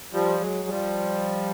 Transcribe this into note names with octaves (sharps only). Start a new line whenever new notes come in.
F3 G3
F#3 G#3
F3 G3